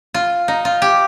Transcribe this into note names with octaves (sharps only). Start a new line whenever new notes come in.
F4
D#4
F4
G4